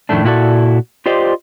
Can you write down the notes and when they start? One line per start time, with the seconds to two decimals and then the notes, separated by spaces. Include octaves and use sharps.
0.09 F2 A2 D#3 A3 D4
0.24 A#2 E4 F#4 A4 D5
1.06 F4 G4 C5 D5 D#5